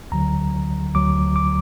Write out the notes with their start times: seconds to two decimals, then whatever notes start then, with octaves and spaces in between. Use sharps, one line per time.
0.12 D2 D3 F#3 A#5
0.95 D2 D3 F#3 D6
1.36 D6